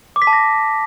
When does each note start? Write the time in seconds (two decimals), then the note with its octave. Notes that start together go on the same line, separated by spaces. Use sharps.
0.16 D6
0.22 B6
0.27 A5
0.33 A#6